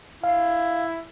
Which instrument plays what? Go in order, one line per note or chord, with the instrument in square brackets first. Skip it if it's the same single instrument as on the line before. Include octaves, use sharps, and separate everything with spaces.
[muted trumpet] E4 [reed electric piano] F5